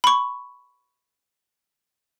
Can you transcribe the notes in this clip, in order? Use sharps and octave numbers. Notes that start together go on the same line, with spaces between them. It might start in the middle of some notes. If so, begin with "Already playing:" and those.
B5 C#6